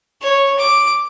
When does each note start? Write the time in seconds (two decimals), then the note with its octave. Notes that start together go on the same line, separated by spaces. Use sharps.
0.21 C#5
0.58 D6